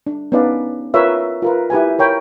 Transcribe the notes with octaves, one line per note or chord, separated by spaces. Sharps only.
D4
B3 C#4 D#4 B4 D5 F5
F4 A#4 B4 C#5 E5 F5
F4 A#4 B4
E4 G4 B4 G#5
A#4 C#5 G5 B5